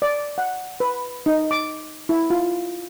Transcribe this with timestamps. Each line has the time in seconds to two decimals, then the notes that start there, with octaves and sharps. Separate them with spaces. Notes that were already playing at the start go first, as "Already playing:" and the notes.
0.02 D5
0.38 F#5
0.80 B4
1.26 D#4
1.51 D6
2.09 E4
2.30 F4